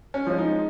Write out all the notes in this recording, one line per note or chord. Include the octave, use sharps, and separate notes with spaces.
C#4
F3 G#3 C#4
D#4